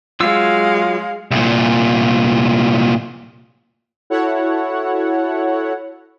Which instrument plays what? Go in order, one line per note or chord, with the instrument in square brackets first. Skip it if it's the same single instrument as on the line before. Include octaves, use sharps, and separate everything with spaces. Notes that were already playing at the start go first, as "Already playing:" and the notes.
[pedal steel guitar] F#3 F4 E6 [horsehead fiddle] G#3 F5
[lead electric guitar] C2 A#2
[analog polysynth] E4 F#4 A4 C#5 F#5